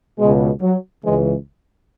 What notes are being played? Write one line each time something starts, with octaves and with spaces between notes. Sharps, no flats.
C#2 B2 G#3
F#3
C#2 C#3 E3 G#3